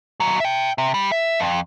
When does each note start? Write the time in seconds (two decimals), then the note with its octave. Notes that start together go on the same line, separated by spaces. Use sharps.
0.20 D#2 F#3
0.40 E5 G5
0.78 C3
0.94 G3
1.12 E5
1.40 F2